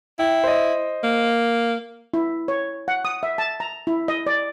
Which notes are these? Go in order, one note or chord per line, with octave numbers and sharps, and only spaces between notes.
E4 G5
C5 D#5
A#3
E4
C#5
F#5
D#6
E5
A5
A#5
E4
D#5
D5